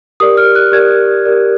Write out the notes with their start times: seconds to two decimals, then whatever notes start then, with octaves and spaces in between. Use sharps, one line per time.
0.20 G4 A#4 D5 D#6
0.37 F6
0.55 F#6
0.72 G4 A#4 D5 G#6
1.25 G4 A#4 D5